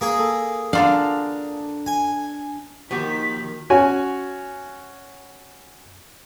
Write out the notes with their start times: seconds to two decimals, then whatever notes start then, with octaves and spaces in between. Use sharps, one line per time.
0.01 A#3 G#4
0.19 A4
0.73 D3 D4 F4 F5 A#5
1.86 G#5
2.91 D#2 D#3 F3 F#4 G4 B6
3.70 C#4 F#4 C#5 G#5